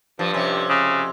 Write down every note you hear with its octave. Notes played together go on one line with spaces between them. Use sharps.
G2 F3
F2 C3 C#4
C#3